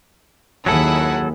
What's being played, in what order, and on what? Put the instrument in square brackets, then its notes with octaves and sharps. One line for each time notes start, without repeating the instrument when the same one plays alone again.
[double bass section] D#2 D#3 [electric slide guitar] F#3 A4 [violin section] E4 G#4 F#5